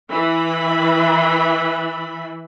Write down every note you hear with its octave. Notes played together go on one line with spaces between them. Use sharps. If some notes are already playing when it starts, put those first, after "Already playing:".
E3 E5 B5